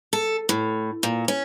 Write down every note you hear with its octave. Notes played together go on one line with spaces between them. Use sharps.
A4
A2
A#2
C#4